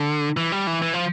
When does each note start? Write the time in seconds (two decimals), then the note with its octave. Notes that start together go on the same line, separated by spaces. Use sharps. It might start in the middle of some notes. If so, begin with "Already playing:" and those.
Already playing: D3
0.37 E3
0.52 G3
0.67 E3
0.82 E3
0.94 F3